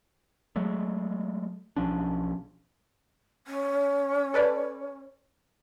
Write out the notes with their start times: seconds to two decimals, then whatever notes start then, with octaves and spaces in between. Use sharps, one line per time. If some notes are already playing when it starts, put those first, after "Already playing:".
0.56 F#3 G#3 A3
1.77 B1 F3 C#4 D4
3.47 C#4
4.34 A4 B4 D5